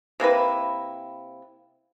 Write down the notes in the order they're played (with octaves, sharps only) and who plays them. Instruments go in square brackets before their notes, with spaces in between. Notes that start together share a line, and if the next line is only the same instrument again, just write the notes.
[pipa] C3 A#3 E4 B4